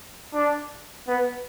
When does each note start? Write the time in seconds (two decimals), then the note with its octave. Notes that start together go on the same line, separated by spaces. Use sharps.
0.33 D4
1.07 B3